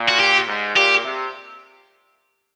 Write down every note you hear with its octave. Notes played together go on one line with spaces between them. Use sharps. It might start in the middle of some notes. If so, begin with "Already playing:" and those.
Already playing: A#2
F#4
G4
G#2
A#2 G4
C3